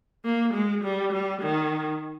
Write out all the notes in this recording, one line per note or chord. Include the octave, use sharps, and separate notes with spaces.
A#3
G#3
G3
G3
D#3